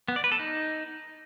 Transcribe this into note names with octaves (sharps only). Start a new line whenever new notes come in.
B3
D5
B4
A4
D#4